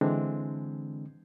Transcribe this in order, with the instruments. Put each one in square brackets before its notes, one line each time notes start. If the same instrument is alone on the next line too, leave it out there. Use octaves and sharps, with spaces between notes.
[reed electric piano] D3 E3 G#3 C4 D4